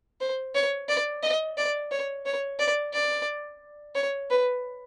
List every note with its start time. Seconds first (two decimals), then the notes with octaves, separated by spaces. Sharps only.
0.21 C5
0.55 C#5
0.88 D5
1.23 D#5
1.57 D5
1.91 C#5
2.26 C#5
2.59 D5
2.93 D5
3.95 C#5
4.30 B4